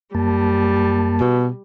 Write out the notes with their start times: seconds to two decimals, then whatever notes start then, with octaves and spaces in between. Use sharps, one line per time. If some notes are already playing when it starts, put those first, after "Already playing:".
0.15 F#2 G3 A#3 A5
1.20 B2